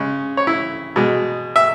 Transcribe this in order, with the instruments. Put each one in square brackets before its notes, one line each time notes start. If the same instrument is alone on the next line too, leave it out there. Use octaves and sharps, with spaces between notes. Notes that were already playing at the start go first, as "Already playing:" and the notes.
Already playing: [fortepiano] C#3 G#3
C#5
E4
B2 G#3
E5